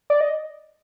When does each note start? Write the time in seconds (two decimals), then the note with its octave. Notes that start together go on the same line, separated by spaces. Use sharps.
0.10 D5
0.21 D#5